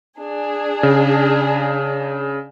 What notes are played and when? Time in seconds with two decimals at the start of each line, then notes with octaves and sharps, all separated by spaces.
0.20 D4 G#4
0.83 C#3